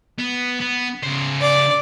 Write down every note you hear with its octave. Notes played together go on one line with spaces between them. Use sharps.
B3
B3
C#3 C5
D5